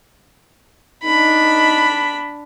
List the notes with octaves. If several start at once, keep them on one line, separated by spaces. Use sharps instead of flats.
D4 D#4 B5